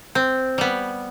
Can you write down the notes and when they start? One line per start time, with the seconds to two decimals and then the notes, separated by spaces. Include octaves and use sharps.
0.15 C4
0.58 G3 B3